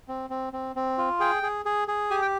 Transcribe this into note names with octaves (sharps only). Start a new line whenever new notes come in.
C4
C4
C4
C4
F4
G#4 G5
G#4
G#4
G#4
G4 G#5
G5